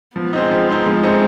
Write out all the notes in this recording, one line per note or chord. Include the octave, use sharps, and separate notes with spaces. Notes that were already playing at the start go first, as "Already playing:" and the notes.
F3 B3
G#3 C4 D#4
F3
G#3 C4 D#4
F3 G#3
A3 C4 D#4